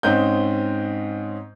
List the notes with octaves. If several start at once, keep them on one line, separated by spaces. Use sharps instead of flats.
G#2 C4 C#4 D#5 F#6 G6